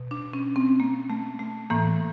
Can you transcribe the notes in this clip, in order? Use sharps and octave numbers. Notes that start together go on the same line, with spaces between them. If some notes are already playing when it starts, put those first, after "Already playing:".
Already playing: B2
D4
C#4
C4
A#3
A3
A3
A2 E3 A#3